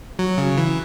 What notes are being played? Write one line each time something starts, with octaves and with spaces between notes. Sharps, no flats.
F#3
C#3
E3